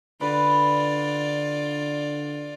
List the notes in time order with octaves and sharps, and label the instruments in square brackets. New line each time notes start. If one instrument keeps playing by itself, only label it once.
[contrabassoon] D3 [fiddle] F4 D5 [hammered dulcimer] B4